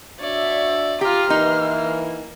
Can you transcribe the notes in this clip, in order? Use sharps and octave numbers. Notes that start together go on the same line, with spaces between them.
D4 F#4 C#5 D5 E5
F4 G4 A#5 C6 F6
E3 A#3 D#4